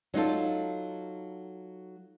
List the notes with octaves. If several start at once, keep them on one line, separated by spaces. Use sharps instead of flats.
F#3 D#4 F4 A4